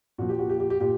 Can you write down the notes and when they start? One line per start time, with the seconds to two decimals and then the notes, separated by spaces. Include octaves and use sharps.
0.18 A#2 F3 F#4
0.29 G4
0.39 F#4
0.50 G4
0.60 G4
0.70 G4
0.80 A#2 G4